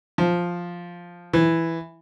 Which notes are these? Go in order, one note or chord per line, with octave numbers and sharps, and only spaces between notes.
F3
E3